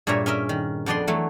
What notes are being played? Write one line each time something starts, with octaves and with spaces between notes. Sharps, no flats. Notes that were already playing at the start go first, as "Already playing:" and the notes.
G2 A#2 G#4 C#5 E5 A#5
C#4 A#4 D#5 E5
D#3
F2 B3 D4 D5 D#5 C6
E3 F#3 A3